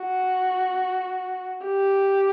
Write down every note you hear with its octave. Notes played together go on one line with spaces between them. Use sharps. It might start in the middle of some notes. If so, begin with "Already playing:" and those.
Already playing: F#4
G4